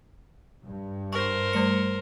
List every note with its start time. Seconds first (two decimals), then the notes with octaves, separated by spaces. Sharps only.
0.65 G2
1.13 A#4 C5 C#6
1.53 G3 A3 C#7